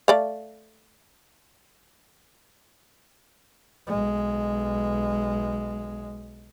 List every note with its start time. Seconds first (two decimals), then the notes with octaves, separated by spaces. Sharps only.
0.08 A3 D5 F5
3.87 B1 G#3